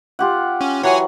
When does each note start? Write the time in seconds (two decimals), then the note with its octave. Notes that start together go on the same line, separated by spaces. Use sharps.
0.19 F4 G4 F#5
0.61 C#4
0.83 E3 F#3 C#5 F#5 G#5